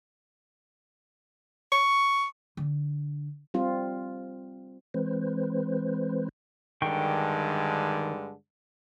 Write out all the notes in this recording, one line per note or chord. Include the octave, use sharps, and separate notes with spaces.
C#6
D3
G3 C4 F4
E3 G#3 C4 B4 C5
G2 D3 D#3 G#3 G5 C#6